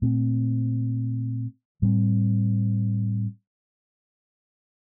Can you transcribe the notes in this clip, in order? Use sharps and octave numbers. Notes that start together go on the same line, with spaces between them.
A#2 A3 C4
A2 G3 C4